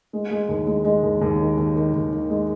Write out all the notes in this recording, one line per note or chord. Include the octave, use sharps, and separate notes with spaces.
G#3
G#3
D#2
G#3
G#3
D#2
D#2
D#3
D#2
D#3
D#2
D#3
G#3